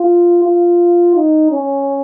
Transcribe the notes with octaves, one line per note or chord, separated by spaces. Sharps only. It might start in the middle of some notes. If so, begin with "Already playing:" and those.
Already playing: F4
F4
D#4
C#4